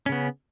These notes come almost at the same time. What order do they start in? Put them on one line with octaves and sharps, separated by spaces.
C#4 C#3 B3